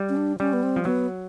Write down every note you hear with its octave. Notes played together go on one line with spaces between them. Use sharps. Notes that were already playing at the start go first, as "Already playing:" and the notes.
Already playing: G3
C#4
D4
G3 C#4
B3
C4
F3
F#3 B3